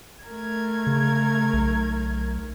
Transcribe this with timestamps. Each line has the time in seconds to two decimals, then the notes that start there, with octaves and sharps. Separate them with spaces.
0.25 A3 A#4 G#6
0.87 C#3
1.54 B1